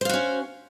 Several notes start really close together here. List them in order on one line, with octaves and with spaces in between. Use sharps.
C5 F5 F#4 C#4